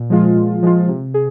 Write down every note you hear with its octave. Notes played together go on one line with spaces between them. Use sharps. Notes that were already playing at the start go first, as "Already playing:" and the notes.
Already playing: A#2
F3 G#3 F4
A#2
F3 G#3 F4
C3
G#4